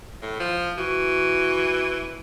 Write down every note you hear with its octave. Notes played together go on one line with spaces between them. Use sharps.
A2
F3
E3 F#4